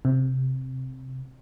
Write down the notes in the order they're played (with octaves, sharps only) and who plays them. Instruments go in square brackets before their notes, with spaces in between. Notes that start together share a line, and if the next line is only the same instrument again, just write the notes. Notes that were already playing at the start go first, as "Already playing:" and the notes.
[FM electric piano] C3